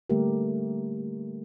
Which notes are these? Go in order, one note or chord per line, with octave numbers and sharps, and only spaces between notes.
D3 G3 A3 A#3 G4 A#4